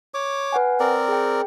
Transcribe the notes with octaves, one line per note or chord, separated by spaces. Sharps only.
C#5 D6
B4 F#5 G#5
C4 A#4 D5
G#4 G5